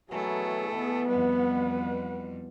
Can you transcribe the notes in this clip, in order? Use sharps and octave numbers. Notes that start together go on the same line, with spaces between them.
B2 E3 F#3 A3 G#4 A4
B2 B3
F2 G3 B4 F#5